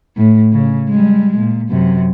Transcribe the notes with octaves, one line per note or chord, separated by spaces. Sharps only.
A2
C#3
G3 G#3
A#2
F#2 C3